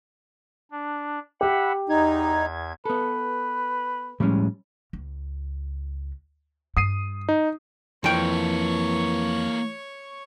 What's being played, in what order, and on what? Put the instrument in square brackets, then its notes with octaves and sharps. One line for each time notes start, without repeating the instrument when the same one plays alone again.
[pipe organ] D4
[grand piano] G4 [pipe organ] E5 F#5 B5
[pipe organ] E2 G#6 [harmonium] D#4
[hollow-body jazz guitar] B3 A4 [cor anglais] B4
[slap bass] A2 F3 G#3 [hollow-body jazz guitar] G3 C#4
[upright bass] C#2
[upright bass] G2 [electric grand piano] D#6 C7 D#7
[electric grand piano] D#4
[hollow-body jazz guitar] F2 G5 [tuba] E3 [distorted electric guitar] A#3 A4 [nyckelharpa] C#5 C#6